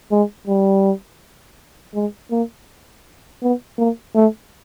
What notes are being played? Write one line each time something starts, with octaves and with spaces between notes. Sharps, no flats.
G#3
G3
G#3
A#3
B3
A#3
A3